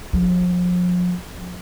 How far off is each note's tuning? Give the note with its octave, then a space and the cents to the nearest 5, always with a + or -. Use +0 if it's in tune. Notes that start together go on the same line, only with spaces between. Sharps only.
F3 +40